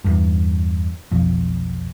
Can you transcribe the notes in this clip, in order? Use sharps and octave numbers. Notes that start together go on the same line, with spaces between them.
E2 G2
F1 B1 F2